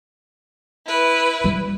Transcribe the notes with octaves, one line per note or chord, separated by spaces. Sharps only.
E4 B4
G3